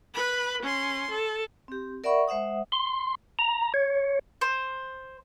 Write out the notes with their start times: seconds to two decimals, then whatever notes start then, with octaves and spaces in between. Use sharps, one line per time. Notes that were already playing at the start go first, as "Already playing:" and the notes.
0.14 B4 B5
0.62 C#4 C6
1.10 A4
1.68 C4 G4
2.04 A#4 D5 E5 F#5 B5 C#6
2.28 G#3 C5 E5 F#5 D#6
2.72 C6
3.39 A#5
3.74 C#5
4.41 C5